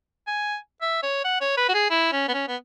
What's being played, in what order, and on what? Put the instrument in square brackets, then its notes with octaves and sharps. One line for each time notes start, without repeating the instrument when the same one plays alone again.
[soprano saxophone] G#5
E5
C#5
F#5
C#5
B4
F#4
G#4
E4
C#4
B3
C#4
B3